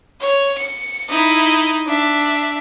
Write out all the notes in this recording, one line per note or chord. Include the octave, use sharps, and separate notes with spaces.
C#5
C#7
D#4 E4
D4 E5